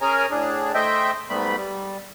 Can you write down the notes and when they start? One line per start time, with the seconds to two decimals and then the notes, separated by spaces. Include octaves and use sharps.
0.01 C#4 G#4 A#4 C#5 G#5 A#5
0.31 A2 D4 G#4
0.74 A3 C5 D#5 E5 G5
1.29 G#2 G3 A3 B3 B5
1.56 G3